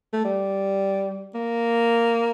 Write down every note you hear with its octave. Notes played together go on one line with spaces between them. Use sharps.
A3
G3
A#3